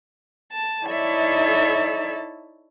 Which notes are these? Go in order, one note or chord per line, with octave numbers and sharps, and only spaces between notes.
A5
D#4 E4 A4 C#5 D5 E5